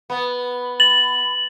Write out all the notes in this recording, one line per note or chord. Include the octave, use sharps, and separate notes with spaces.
B3 B5
A6 F#7